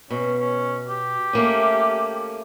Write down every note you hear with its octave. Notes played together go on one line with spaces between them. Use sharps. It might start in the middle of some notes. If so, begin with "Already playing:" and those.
B2 C#4
C#4
G4
A3 A#3 C#4